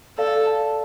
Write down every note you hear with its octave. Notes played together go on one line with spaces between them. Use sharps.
A4 D5 F5
F5 A5